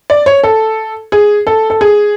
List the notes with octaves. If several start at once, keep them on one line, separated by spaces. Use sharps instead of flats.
D5
C#5
A4
G#4
A4
A4
G#4